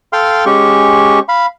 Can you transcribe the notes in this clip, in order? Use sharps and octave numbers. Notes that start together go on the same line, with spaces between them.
A4 F5 G5 C6 F6
G#3 C#4 G4 C#6
F5 B5